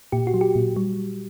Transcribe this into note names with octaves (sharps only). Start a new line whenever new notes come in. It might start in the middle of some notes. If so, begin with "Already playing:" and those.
A#2 G4
F#4
F#3
G4
A#2
G3